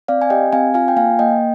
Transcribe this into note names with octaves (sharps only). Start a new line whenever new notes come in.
C4 D5 F5
G#5
G4 D#5 G5
C4 F5 G#5
F4 F5 G#5
G5
A#3 F5 G#5
A#3 D#5 G5